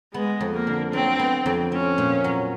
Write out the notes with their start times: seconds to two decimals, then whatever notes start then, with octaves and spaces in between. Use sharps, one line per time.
0.14 G#3 B3
0.41 F2
0.54 A#3
0.67 D3
0.93 F#3 C4
1.19 B3
1.46 F2
1.71 C4 C#4
1.98 A#2
2.24 F#3